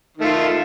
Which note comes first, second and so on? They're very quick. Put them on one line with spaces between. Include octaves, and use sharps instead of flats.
D#3 A3 F4